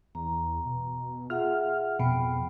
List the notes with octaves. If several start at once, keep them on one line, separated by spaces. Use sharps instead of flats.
E2 A#5
B2
F4 G#4 E5 F#5 F6
F2 B2 G5 B5